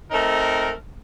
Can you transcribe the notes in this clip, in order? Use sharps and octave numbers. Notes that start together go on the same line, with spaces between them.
A3 C4 D#4 A#4